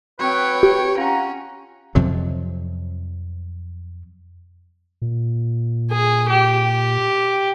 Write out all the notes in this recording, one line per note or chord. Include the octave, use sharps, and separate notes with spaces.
F#3 C4 B4 C#5 G5
G4
C#4 F4 F#5 A#5
F2 C3 F3 F#3
A#2
G#4
G4